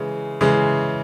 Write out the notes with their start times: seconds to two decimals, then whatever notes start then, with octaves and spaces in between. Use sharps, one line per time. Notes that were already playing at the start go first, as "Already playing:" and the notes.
Already playing: C#3 E3 G#3
0.41 C#3 E3 G#3